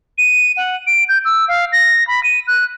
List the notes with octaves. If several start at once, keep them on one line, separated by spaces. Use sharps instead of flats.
D#7
F#5
D7
G6
E6
F5
A#6
B5
D#7
F#6